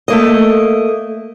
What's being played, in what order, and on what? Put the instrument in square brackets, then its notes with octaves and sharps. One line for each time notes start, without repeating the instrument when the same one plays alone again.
[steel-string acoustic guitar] A3 A#3 D#5